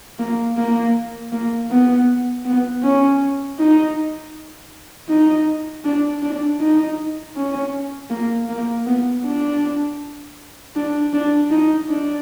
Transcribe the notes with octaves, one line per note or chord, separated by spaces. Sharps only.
A#3
A#3
A#3
B3
B3
C#4
D#4
D#4
D4
D4
D#4
C#4
A#3
A#3
B3
D4
D4
D4
D#4
D4